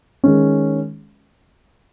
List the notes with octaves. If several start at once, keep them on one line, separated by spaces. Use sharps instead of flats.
D#3 G#3 C#4